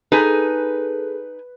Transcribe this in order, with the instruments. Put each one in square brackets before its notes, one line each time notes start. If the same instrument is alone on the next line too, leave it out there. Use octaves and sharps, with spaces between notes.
[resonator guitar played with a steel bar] D#4 G#5 [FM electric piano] G#4 A4 [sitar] B4